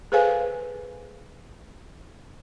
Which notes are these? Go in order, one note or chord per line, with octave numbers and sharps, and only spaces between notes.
G#4 A4 B4 C5 F5 G#5